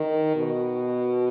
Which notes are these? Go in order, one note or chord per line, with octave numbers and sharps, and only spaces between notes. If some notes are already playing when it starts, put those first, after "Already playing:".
Already playing: D#3
B2